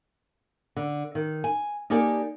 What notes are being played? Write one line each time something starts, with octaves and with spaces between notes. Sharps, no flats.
D3
D#3
G#5
A#3 D#4 G4 A4 D5 G#5